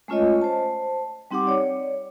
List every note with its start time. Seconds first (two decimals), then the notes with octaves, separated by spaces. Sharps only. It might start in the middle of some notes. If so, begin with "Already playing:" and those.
0.08 G#3 A3 C#4 F4 C#5 D#5
0.41 C5 A5
1.31 G3 C4 D#4 G4 F#5 D6
1.47 C#5 D5